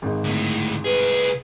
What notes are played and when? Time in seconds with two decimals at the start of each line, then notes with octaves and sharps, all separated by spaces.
0.02 G#1 G#2
0.24 D2 A2
0.84 C2 G#4 B4